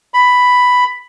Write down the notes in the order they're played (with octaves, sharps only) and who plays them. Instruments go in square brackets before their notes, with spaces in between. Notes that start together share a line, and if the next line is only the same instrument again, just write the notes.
[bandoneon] B5